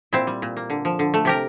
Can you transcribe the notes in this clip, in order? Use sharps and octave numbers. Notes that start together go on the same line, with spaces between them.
A#2 C4 E4
G3
A#2
A#3
D3
F3
D3
A3
C3 G4 A#4